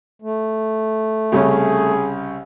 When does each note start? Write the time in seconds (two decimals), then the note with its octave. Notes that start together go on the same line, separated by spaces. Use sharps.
0.22 A3
1.32 C2 C#3 C#4 G#4